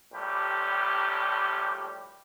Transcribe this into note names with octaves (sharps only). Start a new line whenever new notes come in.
A#1 A2 G3 G4